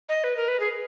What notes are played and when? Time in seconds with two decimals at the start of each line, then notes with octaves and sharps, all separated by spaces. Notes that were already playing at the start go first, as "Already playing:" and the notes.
0.09 D#5
0.24 B4
0.37 A#4
0.48 B4
0.60 G#4